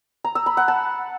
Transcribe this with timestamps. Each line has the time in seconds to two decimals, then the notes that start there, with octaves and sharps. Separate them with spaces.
0.24 A#5
0.35 E6
0.46 B5
0.57 F#5
0.68 A5